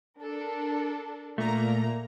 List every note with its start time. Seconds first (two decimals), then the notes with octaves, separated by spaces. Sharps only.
0.19 D4 A4 A#4
1.38 A#2 A3 A#3 A#5